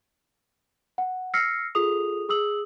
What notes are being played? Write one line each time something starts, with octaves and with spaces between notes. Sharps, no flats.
F#5
E6 F6 A#6 C7 C#7
F4 G#4 A4 D#6 F7
G#4 D#6 E6 F#7